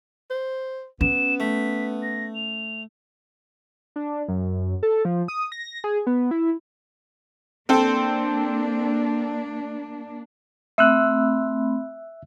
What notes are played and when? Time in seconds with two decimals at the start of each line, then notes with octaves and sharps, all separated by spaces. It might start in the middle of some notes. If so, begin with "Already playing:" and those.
0.30 C5
1.01 B3 C#4 E7
1.40 A3 B6
2.02 A#6
2.35 F7
3.96 D4
4.28 F#2
4.83 A4
5.05 F3
5.28 D#6
5.52 A#6
5.84 G#4
6.07 B3
6.31 E4
7.69 A#3 C4 D4 A4
10.78 A3 C4 E5 B5 E6 F#6